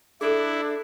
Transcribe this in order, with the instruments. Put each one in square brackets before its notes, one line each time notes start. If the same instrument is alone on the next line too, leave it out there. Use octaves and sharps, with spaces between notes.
[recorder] D4 [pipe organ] E4 [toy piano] G#4 A4